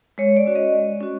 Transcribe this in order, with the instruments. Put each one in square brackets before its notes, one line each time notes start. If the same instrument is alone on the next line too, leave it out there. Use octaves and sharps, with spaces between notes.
[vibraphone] G#3 C#5
D5
C#4 F#4
D#5
G#3
C#4 F#4